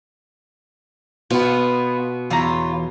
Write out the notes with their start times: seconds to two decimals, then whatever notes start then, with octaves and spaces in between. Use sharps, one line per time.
1.31 B2 B3 F4
2.30 E2 E3 F4 C#5 A#5